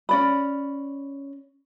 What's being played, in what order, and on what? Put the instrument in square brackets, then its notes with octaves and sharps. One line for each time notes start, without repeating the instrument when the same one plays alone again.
[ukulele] C#4 D5 B5